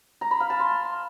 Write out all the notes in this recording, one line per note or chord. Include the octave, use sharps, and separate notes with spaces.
A#5
B5
F5
A5
C6